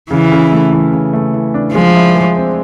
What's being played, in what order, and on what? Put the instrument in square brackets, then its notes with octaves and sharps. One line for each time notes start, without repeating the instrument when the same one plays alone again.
[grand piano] C#3 [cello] E3
[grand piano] C#3
A3
E3
C#3
A3
E3
D4
[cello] F3 [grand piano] G#3
[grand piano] E4
G#3
C4